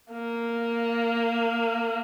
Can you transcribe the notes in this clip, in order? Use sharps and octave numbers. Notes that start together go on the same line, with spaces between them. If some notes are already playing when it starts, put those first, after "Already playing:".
A#3